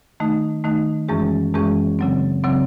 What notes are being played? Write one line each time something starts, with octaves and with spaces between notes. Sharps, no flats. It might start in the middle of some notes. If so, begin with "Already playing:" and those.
D#3 A3 D#4
D#3 A3 D#4
F#2 E3 G#3 C#4 G#4
F#2 E3 G#3 C#4 G#4
C#3 F#3 C4
C#3 F#3 C4